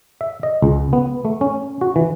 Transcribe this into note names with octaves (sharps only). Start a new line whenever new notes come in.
E5
D#5
C#2
B3
A3
C#4
F#4
E3